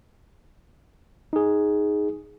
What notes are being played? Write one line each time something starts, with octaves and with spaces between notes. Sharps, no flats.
D#4 G#4